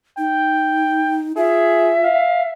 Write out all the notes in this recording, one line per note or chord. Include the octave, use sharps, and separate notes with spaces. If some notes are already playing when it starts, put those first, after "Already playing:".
D#4 G5
F4 G#4 E5
F5